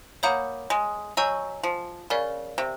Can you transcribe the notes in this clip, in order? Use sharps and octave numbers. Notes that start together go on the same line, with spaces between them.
A#3 C#5 F#5 B5 D#6 G6
G#3
F#3 D#5 G#5 C#6 E6 G6
F3
C#3 A#4 D5 F5
C3